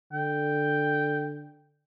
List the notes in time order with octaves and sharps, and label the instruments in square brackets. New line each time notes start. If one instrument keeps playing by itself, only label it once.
[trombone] D3 [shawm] G5